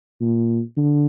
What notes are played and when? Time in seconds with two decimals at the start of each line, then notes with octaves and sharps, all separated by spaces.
0.21 A#2
0.77 D3